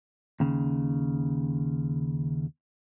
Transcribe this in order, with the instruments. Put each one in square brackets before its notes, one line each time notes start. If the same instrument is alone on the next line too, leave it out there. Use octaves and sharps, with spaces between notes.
[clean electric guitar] D#2 C#3